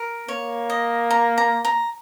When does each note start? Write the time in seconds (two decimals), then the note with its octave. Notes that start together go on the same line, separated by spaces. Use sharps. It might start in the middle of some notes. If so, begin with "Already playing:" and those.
Already playing: A#4
0.28 A#3 C#5
0.70 D#5
1.10 A#5
1.38 A#5
1.65 A#5